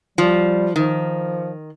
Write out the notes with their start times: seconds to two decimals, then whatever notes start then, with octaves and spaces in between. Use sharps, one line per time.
0.18 F3 G3
0.76 D#3 F3